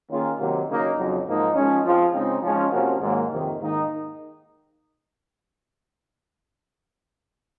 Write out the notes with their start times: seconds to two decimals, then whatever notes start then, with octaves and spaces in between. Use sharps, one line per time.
0.10 D#3 A#3 C#4 F4 G#4
0.39 C3 D#3 F#3 A#3
0.68 C#3 F#3 A#3 D#4
0.97 F2 C#3 F#3
1.26 G#2 F3 A#3 D#4
1.55 F3 G#3 C#4
1.85 F3 C4 F4 G#4
2.13 C#3 G#3 C4 D#4
2.43 F3 G#3 C#4 F4
2.72 C3 F3 A#3 C#4 F#4
3.01 G#2 D#3 F#3 A#3
3.30 F2 C3 D#3
3.59 G#2 D#3 A#3 D#4